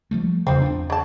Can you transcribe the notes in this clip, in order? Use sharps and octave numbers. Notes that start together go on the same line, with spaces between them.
F3 G3 A3
E2 C#3 F3 C4
E2 D4
C#3 A5